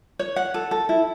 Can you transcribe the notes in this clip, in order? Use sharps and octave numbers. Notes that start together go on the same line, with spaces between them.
C#5
F#5
A4
A4
E4